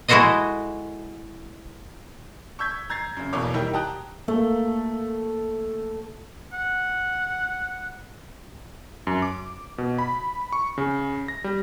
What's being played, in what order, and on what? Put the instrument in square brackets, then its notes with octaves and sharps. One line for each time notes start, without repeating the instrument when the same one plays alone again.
[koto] G#3 E4 F#4 A4 C5 D#5
[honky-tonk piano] C#6 E6 G6 G#6 B6
A#5 G#6 A6 C7
F#2 C#3
B1 E2 B2 A#3 C#5 D6
D#3 G3 D#4 E4 G4 A#4
G4 G5 A5 A#5 D#6 F#6
[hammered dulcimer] A3 [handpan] A#3
[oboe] F#5
[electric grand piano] F#2
D6
B2
B5
C#6
C#3
A#6
G3